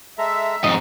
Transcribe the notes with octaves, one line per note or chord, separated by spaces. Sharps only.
G#3 A4 E5 A#5
F2 G#2 D#5